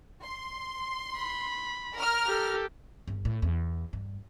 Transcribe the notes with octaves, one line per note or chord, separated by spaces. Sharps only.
C6
B5
A#4 F6
G4 A4
G1
A2
E2
G2